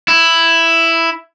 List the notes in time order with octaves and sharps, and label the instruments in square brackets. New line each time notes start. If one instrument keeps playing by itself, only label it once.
[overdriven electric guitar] E4